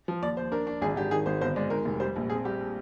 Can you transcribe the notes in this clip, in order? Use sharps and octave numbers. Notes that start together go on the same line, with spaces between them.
F3
D#2 D5
D#2 C5
D4 A#4
D4
G#1 G#4
G#1 G4
D#3 G#4
G#1 C5
G1 C5
G#3 D5
D#3 A#4
F1
G3 C5
A#1
C4 G#4
G3 G4